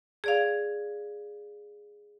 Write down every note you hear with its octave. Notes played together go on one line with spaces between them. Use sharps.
G#4 D5 F5